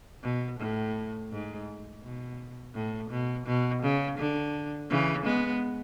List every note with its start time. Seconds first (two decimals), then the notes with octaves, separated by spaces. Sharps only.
0.23 B2
0.59 A2
1.32 G#2
2.03 B2
2.75 A2
3.10 B2
3.46 B2
3.83 C#3
4.18 D3
4.90 C#3 E3
5.26 G#3 B3